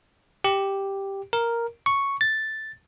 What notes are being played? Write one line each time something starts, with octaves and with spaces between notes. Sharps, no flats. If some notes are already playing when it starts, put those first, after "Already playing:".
G4
A#4
C#6
A6